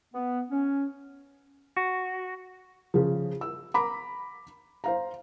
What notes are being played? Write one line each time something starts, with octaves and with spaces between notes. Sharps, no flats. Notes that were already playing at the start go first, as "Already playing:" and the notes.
B3
C#4
F#4
C#3 F3
E6
A#5 B5 D6
C5 F5 A#5